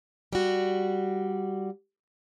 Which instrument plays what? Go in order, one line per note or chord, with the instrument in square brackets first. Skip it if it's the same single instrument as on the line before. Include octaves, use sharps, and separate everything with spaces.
[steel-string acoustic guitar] G3 F#4